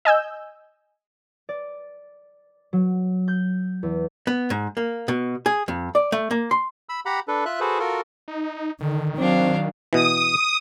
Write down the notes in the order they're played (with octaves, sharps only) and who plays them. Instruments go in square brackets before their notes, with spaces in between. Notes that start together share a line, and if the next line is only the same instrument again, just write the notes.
[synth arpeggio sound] D#5 G#5 E6 G6
[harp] D5
F#3
G6
E2
[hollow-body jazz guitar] B3
G#2
A#3
B2
G#4
F2
D5
A3
A#3
C6
[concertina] B5 E6
G4 F#5 A#5 B5
D4 A4 B4
F4 E5 F#6
F#4 G#4 A4 B4 C5
F4 F#4 A4 A#4
[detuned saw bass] D#4
[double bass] D3 [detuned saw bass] D#3
[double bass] F#3 [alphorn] C4 [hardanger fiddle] D4 F5
[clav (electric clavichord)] B2 E3 [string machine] D#6